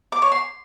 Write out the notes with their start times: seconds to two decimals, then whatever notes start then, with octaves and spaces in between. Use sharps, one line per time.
0.12 D6
0.22 C#5
0.32 C6